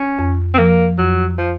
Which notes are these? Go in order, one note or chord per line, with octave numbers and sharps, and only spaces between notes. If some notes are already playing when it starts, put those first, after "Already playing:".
Already playing: C#4
F2
C4
F3 A#3
F2 F#3
F3